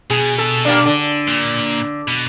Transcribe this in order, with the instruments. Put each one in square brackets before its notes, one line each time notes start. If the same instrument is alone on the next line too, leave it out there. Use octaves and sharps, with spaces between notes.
[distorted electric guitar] B2 [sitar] G#4
[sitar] A4
G3 A#3 D4
D3
[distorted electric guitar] A#2
B2